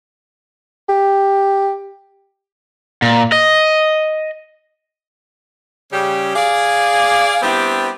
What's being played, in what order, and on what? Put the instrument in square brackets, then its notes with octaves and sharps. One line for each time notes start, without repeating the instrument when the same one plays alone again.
[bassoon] G4
[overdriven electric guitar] A#2
D#5
[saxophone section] C#3 G3 G4
G#4 D5 F5
G3 B3 C4 D4 E4 G4